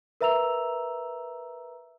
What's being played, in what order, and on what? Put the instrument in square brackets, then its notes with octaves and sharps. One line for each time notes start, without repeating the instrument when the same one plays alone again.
[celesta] A#4 B4 E5 A#5 E6 F7